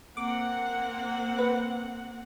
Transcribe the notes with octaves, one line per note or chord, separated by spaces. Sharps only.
A#3 C4 F#5 D6
B4